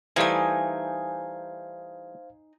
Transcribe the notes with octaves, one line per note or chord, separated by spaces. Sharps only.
E3 G3 A3 D#4 C5 F5 G#5 G#6